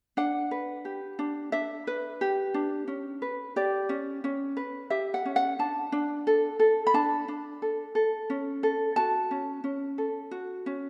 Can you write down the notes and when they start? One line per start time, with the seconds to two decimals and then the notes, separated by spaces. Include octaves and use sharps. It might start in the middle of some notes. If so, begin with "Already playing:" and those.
0.17 D4 F#5
0.51 B4
0.85 G4
1.19 D4
1.52 D4 E5
1.87 B4
2.21 G4
2.54 D4
2.88 C#4
3.22 B4
3.56 G4 D5
3.89 C#4
4.24 C#4
4.57 B4
4.90 G4 E5
5.14 F#5
5.25 C#4
5.36 F#5
5.59 D4 A5
5.92 D4
6.27 A4
6.60 A4
6.87 B5
6.94 D4 A5
7.28 D4
7.62 A4
7.95 A4
8.30 C#4
8.63 A4
8.96 F#4 A5
9.31 C#4
9.64 C#4
9.98 A4
10.31 F#4
10.66 C#4